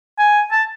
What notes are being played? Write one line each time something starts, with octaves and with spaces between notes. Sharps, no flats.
G#5
A5